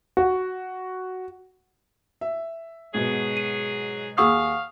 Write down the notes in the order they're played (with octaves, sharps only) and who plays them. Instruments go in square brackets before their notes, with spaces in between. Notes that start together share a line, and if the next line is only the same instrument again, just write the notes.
[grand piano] F#4
[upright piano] E5
[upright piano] G#2 B2 [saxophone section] F#3 G#4
[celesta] D#7
[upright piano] D#2 G#4 E6 [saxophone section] F5 [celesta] F#5 C#6 D#6